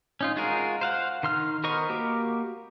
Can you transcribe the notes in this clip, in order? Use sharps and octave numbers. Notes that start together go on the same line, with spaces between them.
C#4 D#4 F4
G#3 F4 F#4 G#4 A#4
C5 F5 F#5
D#3 C6 F6
B3 A#4 C5 D#5 C#6
A#3 F#4 G4 A#4 D6